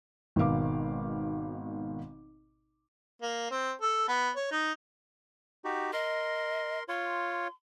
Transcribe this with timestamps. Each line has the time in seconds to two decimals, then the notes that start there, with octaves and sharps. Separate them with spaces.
0.36 G#1 B2 D#3 F5 D6
3.22 A#3
3.51 C4
3.81 A4
4.08 B3
4.36 C#5
4.51 D#4
5.65 D#4 F#4 G4
5.93 A#4 D#5 C6
6.88 F4 C#5 C6